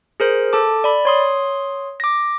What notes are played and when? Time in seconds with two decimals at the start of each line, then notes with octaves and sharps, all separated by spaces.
0.20 G#4 A#4 C5
0.53 A4 A5 D6
0.84 D5 B5
1.05 C#5 C6 D#6
2.00 D6 A#6